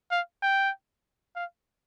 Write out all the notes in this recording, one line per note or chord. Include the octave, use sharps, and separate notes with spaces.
F5
G5
F5